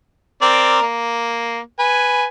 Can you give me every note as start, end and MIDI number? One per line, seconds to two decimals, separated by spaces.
0.42 0.82 60
0.42 0.82 70
0.42 0.82 74
0.82 1.60 58
1.79 2.25 71
1.79 2.25 80